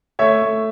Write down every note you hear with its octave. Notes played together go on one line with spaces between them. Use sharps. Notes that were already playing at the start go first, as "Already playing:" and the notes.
A3 C#5 E5
A3